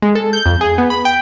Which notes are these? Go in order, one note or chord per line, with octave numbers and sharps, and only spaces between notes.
G#3
A4
G6
F2
G#4
B3
B5
G5